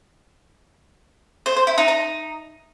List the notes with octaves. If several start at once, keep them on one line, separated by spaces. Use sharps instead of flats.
C5
C5
E4
D#4
D#4